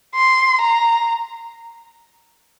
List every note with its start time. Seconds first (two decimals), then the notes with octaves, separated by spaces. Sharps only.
0.15 C6
0.61 A#5